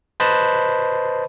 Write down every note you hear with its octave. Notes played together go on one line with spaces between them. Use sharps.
B4 C5 D#5 A5 B5